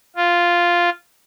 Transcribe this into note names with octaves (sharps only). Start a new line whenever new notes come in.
F4